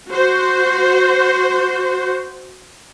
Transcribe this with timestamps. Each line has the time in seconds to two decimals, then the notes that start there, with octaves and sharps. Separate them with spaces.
0.10 F#4 C5